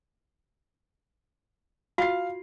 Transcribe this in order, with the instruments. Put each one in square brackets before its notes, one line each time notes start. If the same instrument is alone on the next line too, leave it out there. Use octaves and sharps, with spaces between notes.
[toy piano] F4 F#4 [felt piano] F5 C7